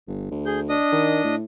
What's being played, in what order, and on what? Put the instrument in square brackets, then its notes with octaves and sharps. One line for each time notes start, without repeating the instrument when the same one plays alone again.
[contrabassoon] G1
D2
[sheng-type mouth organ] G#4 G6
D4 D#5 D#6
[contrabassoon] D#3
A2